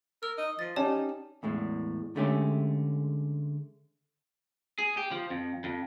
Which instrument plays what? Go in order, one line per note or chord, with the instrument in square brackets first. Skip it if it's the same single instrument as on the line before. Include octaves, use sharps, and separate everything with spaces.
[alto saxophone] A#4 [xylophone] E6
[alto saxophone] D#5
[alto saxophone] F3 [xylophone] A6
[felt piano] C#4 G4 D5 [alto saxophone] D#4 [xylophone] C#5 A5
[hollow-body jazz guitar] E2 A2 G#3
D3 G#3 A3 C#4 G4
[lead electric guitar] G#4
G4
F3
F2
F2